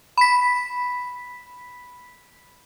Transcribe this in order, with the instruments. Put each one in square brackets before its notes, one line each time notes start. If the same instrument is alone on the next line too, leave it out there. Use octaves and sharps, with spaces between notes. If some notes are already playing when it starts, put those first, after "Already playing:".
[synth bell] B5 B6